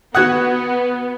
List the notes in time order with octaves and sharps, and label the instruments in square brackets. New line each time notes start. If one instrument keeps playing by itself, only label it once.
[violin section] B3 [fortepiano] F#4 F#5 [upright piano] D#6 F#6 G#6